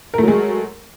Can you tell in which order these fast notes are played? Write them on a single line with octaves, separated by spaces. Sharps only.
A#4 A3 F#3 G#3